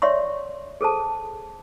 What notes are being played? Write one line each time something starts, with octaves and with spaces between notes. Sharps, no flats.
C#5 D5 E5 F#5 C6 C#6
G#4 A4 C5 A5